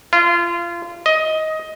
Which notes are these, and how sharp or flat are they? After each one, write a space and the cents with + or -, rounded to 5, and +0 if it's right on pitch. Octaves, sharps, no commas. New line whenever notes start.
F4 -25
D#5 +15